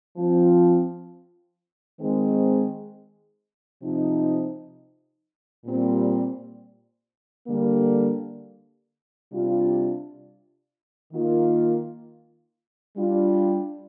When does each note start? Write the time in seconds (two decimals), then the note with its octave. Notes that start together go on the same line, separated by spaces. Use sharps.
0.17 F3 C4 F4
2.00 D#3 G#3 C4
3.82 C3 F3 C4 D#4
5.65 A#2 G3 C4
7.47 D3 G3 A#3
9.31 C3 G3 D4 F4
11.13 D#3 A#3 F4
12.97 G3 D4 F4